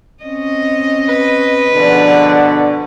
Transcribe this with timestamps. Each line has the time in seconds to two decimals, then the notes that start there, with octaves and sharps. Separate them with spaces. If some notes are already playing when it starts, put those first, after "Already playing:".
0.24 C4 C#4 D#5
1.09 B4
1.74 B2 D3 F3 G#4 D5